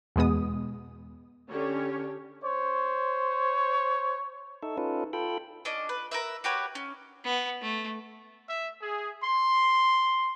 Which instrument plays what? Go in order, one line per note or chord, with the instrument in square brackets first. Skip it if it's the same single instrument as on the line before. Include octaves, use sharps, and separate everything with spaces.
[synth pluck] E2 B2 G#3 B3 D#6
[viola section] D3 G4 C#5 [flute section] C#4
[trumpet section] C5 C#5
[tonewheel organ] D#4 A4 E5
C#4 D#4 F4 A4 B4
F4 A4 G5 B5
[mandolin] C#4 D4 D#5
B4
A#4 B4 E5
F#4 G4 B4 C#5
C#4
[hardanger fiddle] B3
A3
[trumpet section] E5
G#4
C6